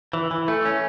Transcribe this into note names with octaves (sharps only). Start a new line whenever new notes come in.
E3
E3
A3
C#4